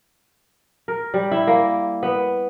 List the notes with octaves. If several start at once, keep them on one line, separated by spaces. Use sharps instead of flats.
A#4
G3
E4
A#3
B3